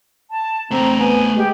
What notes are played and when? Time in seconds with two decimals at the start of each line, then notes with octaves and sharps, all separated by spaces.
0.31 A5
0.71 A3 C4 C5 A#5
0.99 B3 G#5
1.36 G#3 G4